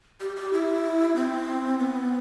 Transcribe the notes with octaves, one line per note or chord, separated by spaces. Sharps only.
G4
G4
E4
C4
B3